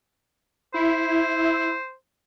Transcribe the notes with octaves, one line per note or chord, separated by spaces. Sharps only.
E4 C5